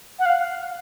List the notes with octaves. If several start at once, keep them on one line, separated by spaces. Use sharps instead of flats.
F#5
F5